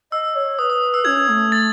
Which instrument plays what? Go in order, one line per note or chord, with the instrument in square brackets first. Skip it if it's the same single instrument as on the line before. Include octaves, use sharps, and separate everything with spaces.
[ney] D#5 [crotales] E6
[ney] C#5
[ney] B4 [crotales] D#6
[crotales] D#6
E6
[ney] C#4 [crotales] G#6
[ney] A3
[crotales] A6